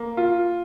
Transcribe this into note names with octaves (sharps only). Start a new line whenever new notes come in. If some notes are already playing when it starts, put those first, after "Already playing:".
Already playing: A#3
F4